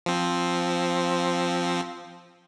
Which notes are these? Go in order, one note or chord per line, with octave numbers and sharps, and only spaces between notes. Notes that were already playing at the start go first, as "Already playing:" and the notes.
F3 C4